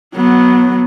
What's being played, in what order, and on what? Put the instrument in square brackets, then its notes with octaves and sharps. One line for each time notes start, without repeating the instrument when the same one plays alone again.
[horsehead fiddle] F#3 B3